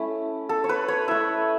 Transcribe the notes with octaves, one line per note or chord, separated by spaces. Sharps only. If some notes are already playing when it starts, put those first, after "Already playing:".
Already playing: A3 C#4 E4
A4
C#5
B4
C#5
A3 E4 E5